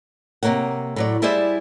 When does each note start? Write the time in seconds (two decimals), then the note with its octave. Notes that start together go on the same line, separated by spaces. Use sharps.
0.43 C3 A3 A#3 C#5 F#5
0.96 A2 F#3 D5
1.22 G3 E4 G#4 C5 D5 E5